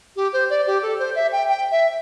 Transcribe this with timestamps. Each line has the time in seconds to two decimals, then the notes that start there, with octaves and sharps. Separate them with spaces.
0.16 G4
0.33 C5
0.50 D5
0.67 G4
0.82 A4
0.99 C5
1.15 E5
1.32 G5
1.49 G5
1.71 E5